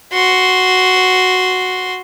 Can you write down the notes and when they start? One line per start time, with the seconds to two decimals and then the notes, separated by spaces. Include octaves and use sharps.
0.13 F#4 C6